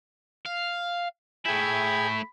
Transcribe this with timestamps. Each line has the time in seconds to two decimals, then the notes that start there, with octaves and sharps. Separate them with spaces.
0.46 F5
1.46 A3 E4 G#4 G5 B5 G#6